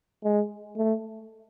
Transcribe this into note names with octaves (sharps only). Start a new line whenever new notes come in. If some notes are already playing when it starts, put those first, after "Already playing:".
G#3
A3